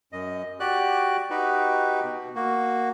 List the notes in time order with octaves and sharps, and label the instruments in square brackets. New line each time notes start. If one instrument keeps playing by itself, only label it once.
[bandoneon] F#2 D#5
F#4 G4 D5 F#6
D#4 F#4 G4 B4
B2
A#3 F#4